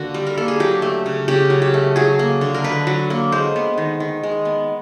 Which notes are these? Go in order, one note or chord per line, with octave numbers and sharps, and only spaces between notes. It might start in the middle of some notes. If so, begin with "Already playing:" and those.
Already playing: D3 A#3 F#4
G3
A#4
A#3 A4
G#4
F#3 G4
A3
C#3
C#3 G4
F#3
G4
A3
F#3 G#4
A#3
D3
A#4
D3 B4
F#3
A#3
G#3 C5
B3
D#3
D#3
G#3
B3